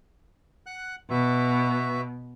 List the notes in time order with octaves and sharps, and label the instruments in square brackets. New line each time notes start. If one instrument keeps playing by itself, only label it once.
[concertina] F#5 F#6
[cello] B2 [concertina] F#4 B4 E5